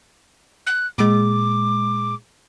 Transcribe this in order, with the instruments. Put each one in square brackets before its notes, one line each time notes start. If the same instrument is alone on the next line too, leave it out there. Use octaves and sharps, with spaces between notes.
[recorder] F#6
[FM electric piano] A#2 G#3 [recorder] D6